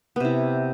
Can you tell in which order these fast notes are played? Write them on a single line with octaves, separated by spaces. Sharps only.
B3 C3 E4